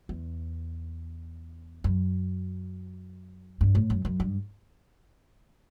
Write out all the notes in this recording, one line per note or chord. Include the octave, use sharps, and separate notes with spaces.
E2
F#2
G2
A2
F#2
F#2
G2